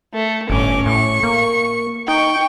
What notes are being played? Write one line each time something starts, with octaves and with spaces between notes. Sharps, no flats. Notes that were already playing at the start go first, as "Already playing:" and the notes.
A3
G1 A2 C#4 D6
A2 C#6
A#3
D#4 G5 C#6